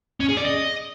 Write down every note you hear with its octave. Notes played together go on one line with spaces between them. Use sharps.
C#4
G#4
D5
D#5